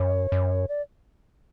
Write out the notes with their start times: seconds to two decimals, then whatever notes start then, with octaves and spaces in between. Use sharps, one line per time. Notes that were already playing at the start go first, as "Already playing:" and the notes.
Already playing: F#2 C#5
0.32 F#2
0.68 D5